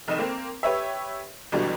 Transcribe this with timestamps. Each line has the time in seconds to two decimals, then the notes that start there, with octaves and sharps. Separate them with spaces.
0.08 F1 D#3 D#5 E7
0.19 A#3 C4
0.63 G4 B4 C#5 E5
1.52 G1 B2 D3 E3 F#3 G3